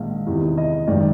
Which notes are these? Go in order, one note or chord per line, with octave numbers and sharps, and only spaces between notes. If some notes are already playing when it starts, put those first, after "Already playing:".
Already playing: A#1 G#2 D#3 F5
E2 C3 D#3
D#5
G#1 F#2 D#3 D5